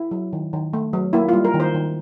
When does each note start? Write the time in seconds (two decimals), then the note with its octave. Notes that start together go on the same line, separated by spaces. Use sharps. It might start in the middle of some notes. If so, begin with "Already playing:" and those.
Already playing: E4
0.11 F#3
0.33 D#3
0.53 D#3
0.73 A3
0.93 F#3
1.13 A#3 E4
1.29 G3 F4
1.45 A#4
1.54 D#3
1.60 C5
1.75 D#3